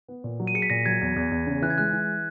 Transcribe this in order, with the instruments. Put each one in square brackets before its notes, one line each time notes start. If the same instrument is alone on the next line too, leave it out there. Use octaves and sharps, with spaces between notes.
[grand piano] B3
A#2
F#3
[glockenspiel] D#7
[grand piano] G#4 [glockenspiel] C#7
[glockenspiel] B6
[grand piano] A#2 [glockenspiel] A#6
[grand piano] F#3 [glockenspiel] G#6
[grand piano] E2
E2
E2
C#3
[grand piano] E3 [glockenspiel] F#6
[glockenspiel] G#6
[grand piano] G#3 [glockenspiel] F#6
[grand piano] E3